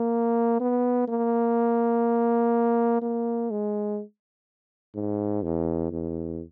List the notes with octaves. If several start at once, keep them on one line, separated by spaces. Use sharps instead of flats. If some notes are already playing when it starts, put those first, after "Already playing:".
Already playing: A#3
B3
A#3
A#3
G#3
G#2
E2
E2